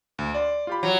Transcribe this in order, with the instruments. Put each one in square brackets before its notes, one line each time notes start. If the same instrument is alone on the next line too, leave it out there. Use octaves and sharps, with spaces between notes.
[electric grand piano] D2
D5 C6
F4 G4 B5
[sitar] F#3